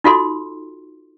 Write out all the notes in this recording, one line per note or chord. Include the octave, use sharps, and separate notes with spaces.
D#4 F4 F#4 A4 C6